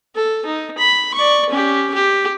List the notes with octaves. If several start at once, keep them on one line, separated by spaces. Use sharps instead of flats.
A4
D#4
B5
D5 C#6
C#4 G4
G4